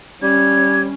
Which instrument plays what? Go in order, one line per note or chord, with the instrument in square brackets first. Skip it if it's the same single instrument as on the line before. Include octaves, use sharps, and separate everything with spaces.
[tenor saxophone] G3 [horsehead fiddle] C#4 [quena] G#6